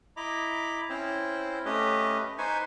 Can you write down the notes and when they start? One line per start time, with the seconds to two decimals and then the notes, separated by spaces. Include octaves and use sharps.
0.17 E4 D#5 A#5 B5 D6
0.89 C4 C#4 E4 C5
1.65 A3 C#4 G4 B4 D#5
2.38 D#4 B4 C5 G#5 C#6